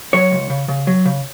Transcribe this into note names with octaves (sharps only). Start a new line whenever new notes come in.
F#3 C#5
C#2
C#3
C#3
F#3
C#3